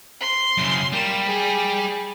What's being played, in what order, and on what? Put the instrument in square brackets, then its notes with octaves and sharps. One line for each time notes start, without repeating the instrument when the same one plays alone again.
[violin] C6
[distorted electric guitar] F#2 C#3
[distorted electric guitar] G3 [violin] A#3 E7
[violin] G#4